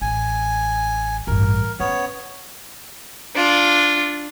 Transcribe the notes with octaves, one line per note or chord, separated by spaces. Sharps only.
A1 G#5
A1 G2 A#4
B3 C#4 C#5
D4 F4